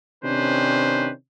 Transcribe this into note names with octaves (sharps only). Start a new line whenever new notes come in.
C3 D#3 C#4 D4 B4 C5